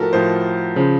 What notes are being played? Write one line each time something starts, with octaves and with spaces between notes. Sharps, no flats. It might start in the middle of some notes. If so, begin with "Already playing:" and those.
Already playing: A2 F3 F#4 A4 A#4
A2 F3 C5
C#3 F3